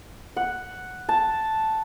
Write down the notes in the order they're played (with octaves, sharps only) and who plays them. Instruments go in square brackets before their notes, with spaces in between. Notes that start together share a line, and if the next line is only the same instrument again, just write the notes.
[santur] F#5
A5